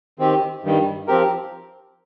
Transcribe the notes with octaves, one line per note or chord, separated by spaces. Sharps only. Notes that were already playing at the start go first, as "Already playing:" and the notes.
D#3 C4 G4
G2 D#3 G3
F3 C4 G4 A#4